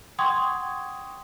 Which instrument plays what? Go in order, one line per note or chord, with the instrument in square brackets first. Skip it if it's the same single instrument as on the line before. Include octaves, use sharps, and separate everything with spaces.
[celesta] F#5 G5 C6 C#6 D#6 G#6